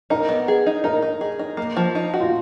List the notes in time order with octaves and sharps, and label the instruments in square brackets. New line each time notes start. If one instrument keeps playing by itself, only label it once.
[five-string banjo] D#4 [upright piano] A#4
[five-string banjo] B3
G#4
D#4
[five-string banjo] D#4 [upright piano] A#4
[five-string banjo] D#4
G#4
D#4
A#3
F3
D#4
F#4
[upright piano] F4